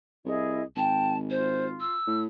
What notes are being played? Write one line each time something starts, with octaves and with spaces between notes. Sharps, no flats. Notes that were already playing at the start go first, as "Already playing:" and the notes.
C2 E4 G#4 D#5
G#1 G5 A5
F4 C5
E6
A2